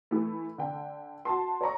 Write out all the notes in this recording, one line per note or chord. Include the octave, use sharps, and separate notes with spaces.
E3 A3
D3 G5
F#4 A5 C6
C#5 D5 A#5 C#6